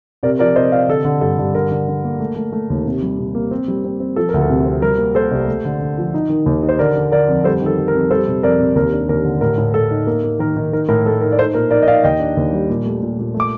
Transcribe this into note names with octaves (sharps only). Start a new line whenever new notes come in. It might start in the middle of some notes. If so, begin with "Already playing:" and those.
C3 A#4 D5
F3 A#4 D5
C3 C5 D#5
C3 D5 F5
D3 A4
D3
G2 A4
G2
D3 A#4
D3
D3
A#3
A3
A3
A3
D#2
C3
G3
C3
A#3
C4
G3
C4
C4
F3 A4
D2 A#4
A4
C3
C4
G3 A#4
A#3
A#3 A4 C5
C2
A3
D3
D3
F3
D#4
D#3
D#2
D#4
C5
D3 A#4 D5
D3
D3 A#4 D5
F2
G3 A4 C5
D#3 A4
G3
A#4
F2
G3 A4 C5
C3
F2 A#4 D5
C3
D#2 A#4
D4
D#2 A#4
D3
A2 A#4
A2
A2 A4
D#4
A#3 A#4
A#3
D#3 A#4
D#3
D#4 A#4
A2 A#4
A3 A4
D#4 A#4
D5
D#4 A4 C5
A#2 A#4
D#4 A#4 D5
D#5
D#4 D5 F5
D#2 D#5 G5
D4
D#2
G3
A#2
A3
A#2
A#2
A3
D6